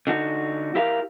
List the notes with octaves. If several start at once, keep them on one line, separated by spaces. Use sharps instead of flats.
D3 D#4 F#4
E4 G4 A#4 F5